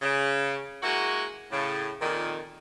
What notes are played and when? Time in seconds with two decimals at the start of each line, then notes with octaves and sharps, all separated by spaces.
0.01 C#3
0.82 G#3 A#3 E4 F#4
1.52 A2 C#3
2.01 F2 A#2 D#3